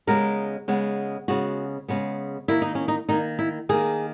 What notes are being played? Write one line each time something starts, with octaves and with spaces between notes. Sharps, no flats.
C#3 G#3 B3 A#4
C#3 G#3 B3
C#3 G#3 B3 F#4
C#3 G#3 B3
D#3 A#3 E4
D#4
C#4
D#4
D#3 A#3 D#4
E4
D#3 A#3 G#4